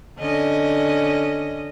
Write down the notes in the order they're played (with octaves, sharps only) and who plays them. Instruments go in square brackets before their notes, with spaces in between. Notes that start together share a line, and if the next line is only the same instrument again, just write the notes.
[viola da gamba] D3 C#4 D#5